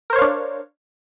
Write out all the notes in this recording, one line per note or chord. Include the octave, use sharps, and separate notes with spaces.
D4 A#4 C5 C#5 F5